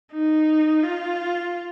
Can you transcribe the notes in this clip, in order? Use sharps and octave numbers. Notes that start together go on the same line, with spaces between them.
D#4
F4